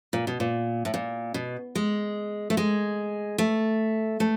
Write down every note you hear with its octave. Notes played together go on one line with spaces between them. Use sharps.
A#2
B2
A#2
A2
A#2
B2
G#3
A3
G#3
A3
A3